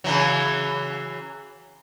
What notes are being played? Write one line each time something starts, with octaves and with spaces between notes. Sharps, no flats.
C#3 E3 F#3